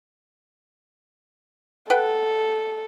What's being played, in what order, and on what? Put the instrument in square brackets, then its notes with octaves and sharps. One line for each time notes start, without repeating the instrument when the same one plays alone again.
[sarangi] A4 [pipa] B4 F#5 G5